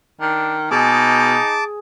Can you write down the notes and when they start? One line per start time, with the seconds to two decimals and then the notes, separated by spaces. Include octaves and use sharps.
0.21 D#3 D4
0.71 B2 D#4 G#4 A5 D6